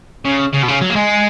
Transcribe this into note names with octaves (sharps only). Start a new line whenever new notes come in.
C#3
C#3
B2
C#3
F#3
A#3
G#3